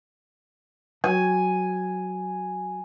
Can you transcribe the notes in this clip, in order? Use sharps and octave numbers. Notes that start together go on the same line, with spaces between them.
F#3 G#5